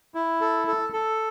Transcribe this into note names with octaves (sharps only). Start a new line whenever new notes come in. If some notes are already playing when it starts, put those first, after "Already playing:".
E4
A4
A4
A4